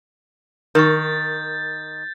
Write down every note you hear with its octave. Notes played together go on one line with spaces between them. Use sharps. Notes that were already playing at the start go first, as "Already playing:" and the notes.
D#3 A#4 G5 C#6 G6 A6